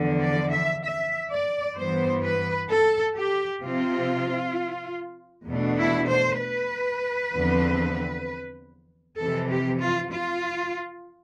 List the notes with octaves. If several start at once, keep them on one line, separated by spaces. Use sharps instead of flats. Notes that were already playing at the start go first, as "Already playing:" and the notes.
Already playing: E2 D3 F3
D5
E5
E5
D5
G2 E3 B3 C5
B4
A4
G4
C3 F3 C4 F4
E2 B2 A3 D4
E4
C5
B4
E2 D3 F3 C4
F2 C3 E3 A4
G4
F4
F4